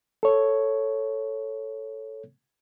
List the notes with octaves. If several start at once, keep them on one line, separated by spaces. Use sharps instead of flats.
A4 C#5